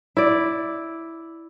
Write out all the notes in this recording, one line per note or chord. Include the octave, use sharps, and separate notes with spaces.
E4 D5